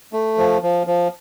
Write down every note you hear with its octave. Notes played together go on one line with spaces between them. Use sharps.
A3
F3
F3
F3